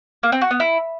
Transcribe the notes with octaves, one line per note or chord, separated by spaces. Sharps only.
A#3
C4
F#4
B3
E4